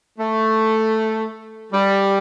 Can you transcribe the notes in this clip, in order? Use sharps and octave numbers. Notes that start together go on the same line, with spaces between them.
A3
G3